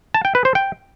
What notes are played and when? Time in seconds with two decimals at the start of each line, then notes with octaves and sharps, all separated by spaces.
0.14 A5
0.25 G5
0.35 B4
0.45 C5
0.55 G5